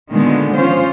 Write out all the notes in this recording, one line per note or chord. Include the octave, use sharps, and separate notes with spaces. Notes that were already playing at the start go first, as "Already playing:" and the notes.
A#2 D3 D#3 G#3 B3
F3 C#4 F4 C5